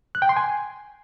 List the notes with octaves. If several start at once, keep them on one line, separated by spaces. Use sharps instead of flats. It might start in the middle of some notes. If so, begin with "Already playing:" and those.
F#6
G5
C6
G#5